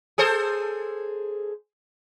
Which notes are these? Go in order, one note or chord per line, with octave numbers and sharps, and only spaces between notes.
G#4 A4 C5